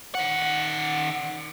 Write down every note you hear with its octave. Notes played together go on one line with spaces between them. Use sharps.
D#3 F#5